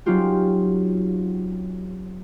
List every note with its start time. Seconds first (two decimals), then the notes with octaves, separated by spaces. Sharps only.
0.06 F#3 C4 C#4 D#4 F4 G4